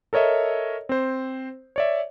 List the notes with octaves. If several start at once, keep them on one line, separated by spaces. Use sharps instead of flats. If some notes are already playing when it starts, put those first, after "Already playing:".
A4 A#4 C#5 D#5 E5
C4 C5
C#5 D5 E5